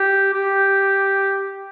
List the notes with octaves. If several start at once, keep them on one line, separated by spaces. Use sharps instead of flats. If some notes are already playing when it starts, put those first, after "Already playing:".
Already playing: G4
G4